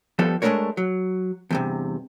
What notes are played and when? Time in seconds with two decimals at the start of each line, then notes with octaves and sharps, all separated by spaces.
0.19 F3 G3 B3 A4
0.42 G#3 A3 C4 D4 A#4 C#5
0.77 F#3
1.51 E2 G2 C3